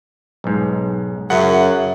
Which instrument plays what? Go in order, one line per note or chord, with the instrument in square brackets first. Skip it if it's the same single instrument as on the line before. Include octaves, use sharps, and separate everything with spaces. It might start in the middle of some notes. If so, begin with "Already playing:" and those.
[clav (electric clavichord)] B1 G#2
[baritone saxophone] F#2 [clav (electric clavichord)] C#3 [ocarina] E5 [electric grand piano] F#5